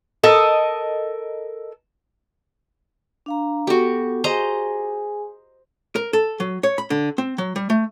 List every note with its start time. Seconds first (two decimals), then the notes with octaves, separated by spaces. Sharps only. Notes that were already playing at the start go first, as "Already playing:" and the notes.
0.24 A4 A#4 D#5
3.26 D4 F5 A#5
3.67 B3 F#4 G4 A4
4.24 G#4 C5 D#5 G#5 A#5
5.96 A#4
6.13 A4
6.40 F#3
6.63 C#5
6.78 B5
6.90 D3
7.18 C4
7.38 F#3
7.56 G3
7.70 A3